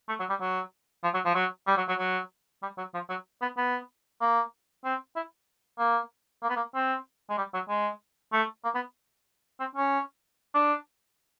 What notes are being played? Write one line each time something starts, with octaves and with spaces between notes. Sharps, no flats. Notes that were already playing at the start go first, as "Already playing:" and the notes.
A3
F#3
G3
F#3
F3
F#3
F3
F#3
G3
F#3
F#3
F#3
G3
F#3
F3
F#3
B3
B3
A#3
C4
E4
A#3
A#3
B3
A#3
C4
G#3
G3
F#3
G#3
A3
A#3
B3
C4
C#4
D4